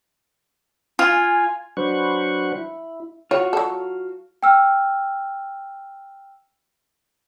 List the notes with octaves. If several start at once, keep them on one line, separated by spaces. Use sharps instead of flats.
F4 G#5
F#3 D4 B4 C5 F#5 C#6
E4
F4 F#4 C#5
F#3 A4
G5 E6 F6